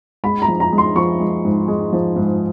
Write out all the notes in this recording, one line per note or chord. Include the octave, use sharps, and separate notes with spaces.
G#3 B5
A#5
F3
A#5
G#3
C6
F3 C#6
G#3
G#2
G#3
F3
G#2